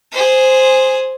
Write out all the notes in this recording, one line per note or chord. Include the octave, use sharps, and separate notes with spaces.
G#4 C5